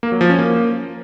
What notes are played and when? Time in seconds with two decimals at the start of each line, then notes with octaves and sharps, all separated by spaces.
0.03 A#3
0.12 F#3
0.21 F3
0.30 C#4
0.39 A#3